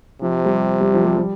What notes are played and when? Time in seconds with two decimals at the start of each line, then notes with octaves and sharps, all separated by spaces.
0.22 C3 F3
0.46 G3
0.81 G3
0.93 F3
1.05 G3
1.17 G3